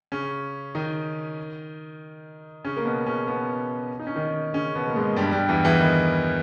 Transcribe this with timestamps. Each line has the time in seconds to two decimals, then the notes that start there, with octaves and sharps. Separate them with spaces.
0.12 C#3 C#4
0.75 D#3 D#4
2.65 C#3 C#4
2.77 A#3
2.85 B2 B3
3.06 C#3 C#4
3.27 B2 B3
3.99 D#4
4.07 C#4
4.15 D#3 D#4
4.53 C#3 C#4
4.75 B2 B3
4.88 A#3
4.95 G#2 G#3
5.16 G2 G3
5.32 G2 G3
5.48 E2 E3
5.64 E2 E3
5.79 D#3